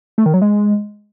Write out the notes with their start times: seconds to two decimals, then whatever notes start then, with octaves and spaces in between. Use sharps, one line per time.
0.18 A3
0.26 D#3
0.34 F#3
0.42 G#3